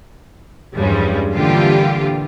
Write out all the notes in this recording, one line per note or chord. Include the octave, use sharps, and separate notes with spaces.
E2 G2 F3 G3 G#3 C#4
A#2 D3 E3 G3 F4 G4